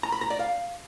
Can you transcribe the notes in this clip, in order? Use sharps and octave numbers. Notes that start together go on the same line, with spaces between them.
A#5
B5
A#5
D5
F5